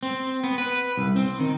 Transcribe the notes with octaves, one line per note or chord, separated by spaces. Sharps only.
C4
B3
B4
C2
C4
D#3